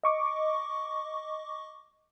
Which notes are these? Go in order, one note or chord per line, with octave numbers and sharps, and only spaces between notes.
D#5 C#6 D6